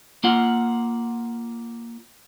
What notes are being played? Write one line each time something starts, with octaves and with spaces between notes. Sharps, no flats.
A#3 F4 F#5